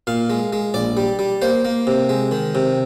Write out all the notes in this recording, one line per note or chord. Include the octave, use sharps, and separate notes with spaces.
A#2 F5
G#3
G#3
A#1 D5
G3
G3
A#3 C5
A#3
C3
G#3
D#3
C3